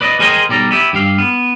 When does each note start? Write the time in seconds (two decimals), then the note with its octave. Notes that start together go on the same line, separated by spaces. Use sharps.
0.01 B4 D5 D#5
0.20 G#4 A#4 C5 D#5 G5 G#5
0.49 B1 G3 D5 A#5
0.71 B3 E4 G4
0.93 G2 G4 F5
1.18 B3